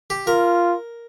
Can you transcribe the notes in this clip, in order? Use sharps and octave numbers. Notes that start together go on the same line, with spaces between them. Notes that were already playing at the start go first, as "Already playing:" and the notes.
G4
F4 A#4